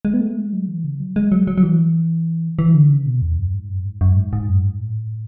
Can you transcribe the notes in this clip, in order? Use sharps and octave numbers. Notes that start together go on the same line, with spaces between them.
G#3
B3
A3
G#3
F#3
E3
C#3
F#3
G#3
F#3
F#3
F#3
E3
E3
D3
C#3
B2
E2
F#2
G#2
F#2
G#2
F#2
G#2
G#2
F#2
G#2
A2